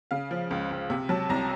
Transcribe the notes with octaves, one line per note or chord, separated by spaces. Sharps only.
C#3 F5
F3
C#2
C#2
C3
F#3 A5
C2 A#5